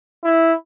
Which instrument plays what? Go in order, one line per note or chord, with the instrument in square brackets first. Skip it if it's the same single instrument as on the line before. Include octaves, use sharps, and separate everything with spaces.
[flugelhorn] E4